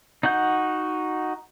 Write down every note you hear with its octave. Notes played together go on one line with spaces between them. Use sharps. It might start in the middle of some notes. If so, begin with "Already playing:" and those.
D#4 F#4 F#5 G6